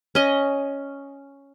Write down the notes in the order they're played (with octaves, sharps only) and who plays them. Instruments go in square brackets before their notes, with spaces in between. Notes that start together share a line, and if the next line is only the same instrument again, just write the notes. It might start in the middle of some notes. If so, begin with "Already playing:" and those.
[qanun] C#4 D#5